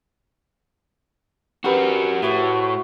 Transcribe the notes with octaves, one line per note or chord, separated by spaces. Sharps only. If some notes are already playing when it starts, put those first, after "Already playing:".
D#4 F#4 G4 A#4 B4
A2 E4 F#4 C5